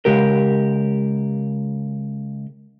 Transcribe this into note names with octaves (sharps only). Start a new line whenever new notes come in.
C#3 G#3 G4 A#4